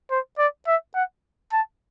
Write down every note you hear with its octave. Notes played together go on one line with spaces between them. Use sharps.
C5
D5
E5
F#5
A5